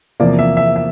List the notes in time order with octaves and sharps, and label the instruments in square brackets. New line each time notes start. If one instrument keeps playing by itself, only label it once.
[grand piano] E2 C3 F3 A#3 D5
E5
E5
E5